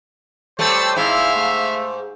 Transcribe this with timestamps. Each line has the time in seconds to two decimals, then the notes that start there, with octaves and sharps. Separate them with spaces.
0.59 G3 A3 C5 C#5 A5 E6
0.97 G#2 E4 E5 F5
1.35 A3